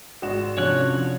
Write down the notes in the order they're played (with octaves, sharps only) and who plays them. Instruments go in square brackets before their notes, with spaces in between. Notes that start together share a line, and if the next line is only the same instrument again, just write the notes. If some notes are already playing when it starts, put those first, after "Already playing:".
[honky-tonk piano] G#1 G#3 E7 [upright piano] F#4
[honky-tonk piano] F2 [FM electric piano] C3 C#4 D4 [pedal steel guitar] C#5 F#6